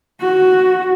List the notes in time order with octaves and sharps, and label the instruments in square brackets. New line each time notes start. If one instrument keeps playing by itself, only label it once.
[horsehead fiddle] F#4